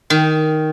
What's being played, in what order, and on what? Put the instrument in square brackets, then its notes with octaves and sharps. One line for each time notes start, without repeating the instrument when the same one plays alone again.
[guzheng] D#3